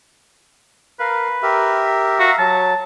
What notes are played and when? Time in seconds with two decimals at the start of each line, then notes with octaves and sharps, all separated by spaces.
1.00 A#4 B4 F5
1.43 G4 A#4 E5
2.20 F#4 E5 F5 A#5
2.39 F#3 A5